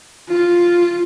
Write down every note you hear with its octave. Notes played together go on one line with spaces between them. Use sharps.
F4